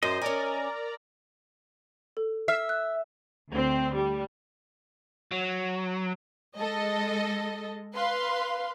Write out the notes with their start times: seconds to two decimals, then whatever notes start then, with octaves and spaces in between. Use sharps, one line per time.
0.03 F#2 C5 D#5
0.21 C#4 A#4 D5 G#5 A#5
2.17 A4
2.48 E5 F6 C7
2.69 F#6
3.52 D2 C4
3.96 G3
5.31 F#3
6.57 G#3 A4 D#5
7.95 B4 F5 C6